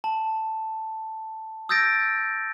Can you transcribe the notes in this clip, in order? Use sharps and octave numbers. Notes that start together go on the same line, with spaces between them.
A5
D#6 E6 G6 A6 A#6 D7